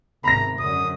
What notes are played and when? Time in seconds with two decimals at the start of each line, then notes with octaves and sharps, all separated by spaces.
0.24 G#1 C3 A3 A#5 B5 A#6
0.59 F#2 D3 D#6